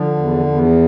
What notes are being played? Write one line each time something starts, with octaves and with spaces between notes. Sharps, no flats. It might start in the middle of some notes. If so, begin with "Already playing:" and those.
Already playing: D3 F3
E2
E2